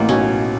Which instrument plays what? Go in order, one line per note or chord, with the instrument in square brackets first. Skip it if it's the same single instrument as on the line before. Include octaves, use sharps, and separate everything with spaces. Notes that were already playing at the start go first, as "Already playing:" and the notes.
Already playing: [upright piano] A1 A2 [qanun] A#3
[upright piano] B1 B2 [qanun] C#4